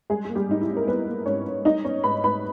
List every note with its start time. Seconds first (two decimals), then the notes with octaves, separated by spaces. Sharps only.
0.10 G3 G#3 G#4
0.25 A#3 G#4
0.35 G3 G4
0.49 G#2 D#4
0.61 E4
0.69 C#4
0.77 A#4
0.87 G3 B3 B4
1.07 A#3
1.26 G#2 C#4 C#5
1.46 C#4
1.65 G3 D#4 D#5
1.84 B3 C#4 C#5
2.04 G#2 B4 B5
2.23 G#2 B4 B5